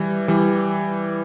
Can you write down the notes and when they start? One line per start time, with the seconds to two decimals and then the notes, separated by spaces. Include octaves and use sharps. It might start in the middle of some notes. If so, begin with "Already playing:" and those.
Already playing: E3 G3
0.28 E3 G3